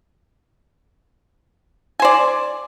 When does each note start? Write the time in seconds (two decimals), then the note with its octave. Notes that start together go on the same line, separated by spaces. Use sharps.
2.00 G#5
2.02 C5
2.05 D5